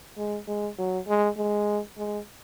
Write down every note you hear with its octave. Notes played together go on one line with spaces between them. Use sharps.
G#3
G#3
F#3
G#3
G#3
G#3